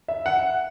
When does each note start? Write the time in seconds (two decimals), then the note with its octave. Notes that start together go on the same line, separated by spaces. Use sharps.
0.08 E5
0.26 F#5